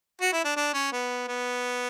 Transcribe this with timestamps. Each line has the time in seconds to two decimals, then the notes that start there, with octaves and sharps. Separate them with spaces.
0.21 F#4
0.32 E4
0.45 D4
0.56 D4
0.74 C#4
0.92 B3
1.28 B3